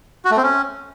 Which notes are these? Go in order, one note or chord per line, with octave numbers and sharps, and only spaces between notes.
F#4
A3
C4
C#4